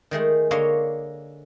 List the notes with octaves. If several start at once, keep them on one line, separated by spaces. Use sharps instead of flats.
D#3 G#3 A3 G#4
D3 A#3 C#5 D#5 F5 C6